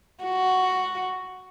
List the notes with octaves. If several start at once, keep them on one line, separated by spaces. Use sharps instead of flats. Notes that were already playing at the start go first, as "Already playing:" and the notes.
F#4